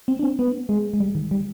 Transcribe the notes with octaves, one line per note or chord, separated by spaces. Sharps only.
C4
D4
C4
B3
G#3
G#3
G3
D#3
G3